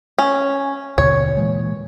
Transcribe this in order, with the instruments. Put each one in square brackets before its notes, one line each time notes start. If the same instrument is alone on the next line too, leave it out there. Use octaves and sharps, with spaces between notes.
[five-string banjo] C#4
[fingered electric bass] D#2 B2 D3 [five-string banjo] C#5
[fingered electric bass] A#2 E3 G#3